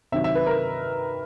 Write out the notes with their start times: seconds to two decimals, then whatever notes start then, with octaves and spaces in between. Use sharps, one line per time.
0.12 C3 D#3 F#3 E5
0.24 E5
0.35 B4
0.46 A#4